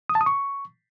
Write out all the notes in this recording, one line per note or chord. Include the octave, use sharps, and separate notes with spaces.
D#6
A5
D#6
C#6